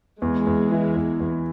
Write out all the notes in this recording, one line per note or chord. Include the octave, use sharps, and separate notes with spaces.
E2 G#3
E2
E3
E2
E2